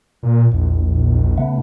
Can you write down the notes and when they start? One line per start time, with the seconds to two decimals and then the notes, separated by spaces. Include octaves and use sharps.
0.23 A#2
0.52 A#1 E2
1.38 C#3 A3 B3